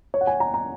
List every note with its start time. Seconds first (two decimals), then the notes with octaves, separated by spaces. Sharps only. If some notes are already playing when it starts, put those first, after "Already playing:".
0.14 C#5
0.21 F#5
0.27 G#5
0.40 A#5
0.54 A#5